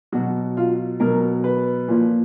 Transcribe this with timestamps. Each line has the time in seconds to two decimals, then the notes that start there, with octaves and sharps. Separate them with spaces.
0.12 B2 F#3 F#4
0.57 F4
1.00 B2 F#3 A#4
1.44 B4
1.88 A#2 F3